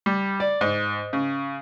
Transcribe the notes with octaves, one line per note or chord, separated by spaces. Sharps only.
G3
D5
G#2
C#3